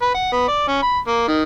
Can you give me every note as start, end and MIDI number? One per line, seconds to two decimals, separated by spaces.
0.02 0.10 71
0.15 0.29 78
0.33 0.45 59
0.48 0.65 74
0.68 0.79 61
0.82 0.99 83
1.08 1.26 58
1.28 1.43 51